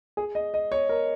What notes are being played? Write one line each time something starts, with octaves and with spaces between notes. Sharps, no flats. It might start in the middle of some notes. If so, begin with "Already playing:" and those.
G#4
D#5
D#5
C#5
A#4